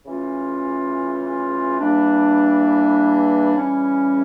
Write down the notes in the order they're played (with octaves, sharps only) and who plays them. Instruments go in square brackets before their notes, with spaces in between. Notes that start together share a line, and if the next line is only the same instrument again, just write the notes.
[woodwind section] C#3 E3 A3 C#4 F4
E2 E3 G3 A#3 D4
C#3 E3 G3 C#4